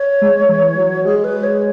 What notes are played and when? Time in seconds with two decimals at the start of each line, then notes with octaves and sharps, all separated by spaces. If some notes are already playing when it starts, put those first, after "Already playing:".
Already playing: C#5
0.22 G#3
0.49 E3
0.77 F#3
1.05 G#3 G#4
1.24 B4
1.43 C#5